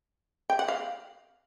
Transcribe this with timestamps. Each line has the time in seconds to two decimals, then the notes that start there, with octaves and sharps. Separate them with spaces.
0.50 G5
0.59 F#5
0.68 F5